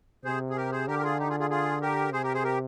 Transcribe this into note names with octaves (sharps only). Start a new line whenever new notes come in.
C3 G#4 C5
G#4
G4 A#4
G#4 C5
D3 G4 A#4
A#4
F4 G#4
D#4 G4
F4 G#4
F4 G#4
F4 G#4
G4 A#4
C3 G#4 C5
G4 A#4
G#4 C5
G4 A#4